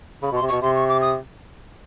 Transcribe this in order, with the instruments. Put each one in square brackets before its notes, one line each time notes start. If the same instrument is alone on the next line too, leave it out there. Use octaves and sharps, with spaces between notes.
[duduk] C#3 [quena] B5
[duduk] B2
[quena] C6
[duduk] C3
[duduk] B2 [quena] C#6
[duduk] C3 [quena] C6
[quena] C#6
D6
D#6